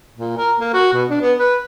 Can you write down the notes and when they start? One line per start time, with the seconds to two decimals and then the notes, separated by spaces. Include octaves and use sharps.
0.16 A#2
0.38 A#4
0.60 A#3
0.74 F#4
0.93 B2
1.10 D4
1.22 B3
1.39 B4